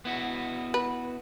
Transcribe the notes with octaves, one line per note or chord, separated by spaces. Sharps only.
B3 E4 F#4
B4